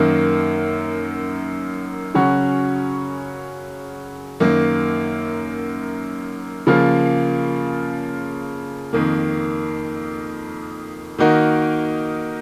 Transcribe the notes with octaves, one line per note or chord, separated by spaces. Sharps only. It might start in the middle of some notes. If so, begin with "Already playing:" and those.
Already playing: F#2 D#3 A#3
C#3 F#3 C#4 F#4
F#2 D#3 A#3
C#3 F3 A#3 F4
F2 D#3 A#3
D#3 A#3 D#4 F#4 A#4